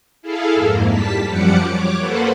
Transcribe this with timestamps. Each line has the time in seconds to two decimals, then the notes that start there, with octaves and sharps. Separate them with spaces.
0.22 E4 G#4 A4 F5
0.54 F2 G#2 A#3
0.86 G3 A5 B6
1.26 F#2 F3 G3 F#5 D6 C#7
1.67 C#5 D6
1.98 A#3 A4 B4 C5 F#5